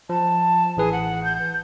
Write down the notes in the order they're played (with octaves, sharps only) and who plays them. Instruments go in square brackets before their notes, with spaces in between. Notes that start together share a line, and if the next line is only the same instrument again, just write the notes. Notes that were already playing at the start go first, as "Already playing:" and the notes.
[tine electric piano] F3 [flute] A5
[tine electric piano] A1 E3 B4 [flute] G#4
[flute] F#5
G6